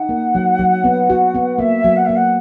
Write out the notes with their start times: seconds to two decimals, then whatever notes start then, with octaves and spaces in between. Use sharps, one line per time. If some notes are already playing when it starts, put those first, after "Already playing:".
Already playing: D#4 F#5
0.09 A#3
0.35 F#3
0.59 F#3
0.84 B3
1.10 F#4
1.34 B3
1.59 A#3 E5
1.84 F#3
1.96 F#5
2.05 A#3 E5
2.15 F#5